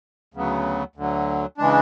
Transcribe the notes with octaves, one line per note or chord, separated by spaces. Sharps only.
D2 C#3 F#3 B3
D2 D3 F#3
C#3 E3 G#3 D4